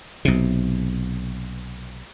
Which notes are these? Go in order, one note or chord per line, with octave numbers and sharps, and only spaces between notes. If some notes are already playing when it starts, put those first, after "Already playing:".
B1 C3